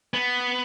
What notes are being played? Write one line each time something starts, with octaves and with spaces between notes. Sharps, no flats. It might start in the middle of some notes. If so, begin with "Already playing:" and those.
B3